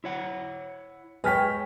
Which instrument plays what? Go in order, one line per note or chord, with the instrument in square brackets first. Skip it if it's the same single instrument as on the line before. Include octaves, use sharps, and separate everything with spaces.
[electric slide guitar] E4 C#5 F#5
[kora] G#3 C#5 [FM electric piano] B4 G5 [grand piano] G#5 F6 B6